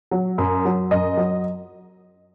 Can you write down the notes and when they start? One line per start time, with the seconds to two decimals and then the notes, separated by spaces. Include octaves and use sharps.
0.11 F#3
0.38 F#2
0.65 F#3
0.91 F#2 D#5
1.17 F#3